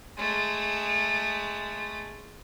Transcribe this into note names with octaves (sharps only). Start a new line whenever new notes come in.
G#3 A3